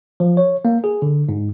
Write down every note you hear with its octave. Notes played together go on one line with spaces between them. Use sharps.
F3
C#5
A#3
G#4
D3
G#2